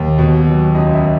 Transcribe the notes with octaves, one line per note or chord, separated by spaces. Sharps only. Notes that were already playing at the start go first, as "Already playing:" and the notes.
Already playing: D#2
B2
F#3
C#2 D#5
E5